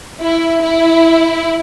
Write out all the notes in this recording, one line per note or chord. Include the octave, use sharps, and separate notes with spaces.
E4
E4